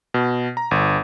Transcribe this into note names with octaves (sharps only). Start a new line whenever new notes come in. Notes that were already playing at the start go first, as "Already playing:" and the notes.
B2
A#5
G1